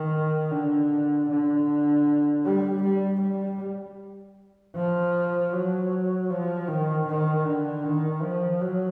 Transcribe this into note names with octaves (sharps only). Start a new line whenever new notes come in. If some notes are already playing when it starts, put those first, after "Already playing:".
Already playing: D#3
D3
D3
G3
G3
G3
F3
F#3
F3
D#3
D#3
D3
D#3
F3
F#3